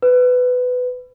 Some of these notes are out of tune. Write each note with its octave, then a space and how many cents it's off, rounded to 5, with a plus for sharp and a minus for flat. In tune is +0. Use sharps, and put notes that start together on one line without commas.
B4 +15